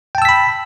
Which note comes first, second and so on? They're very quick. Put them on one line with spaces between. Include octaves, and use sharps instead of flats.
G5 A5 E6 B6 B5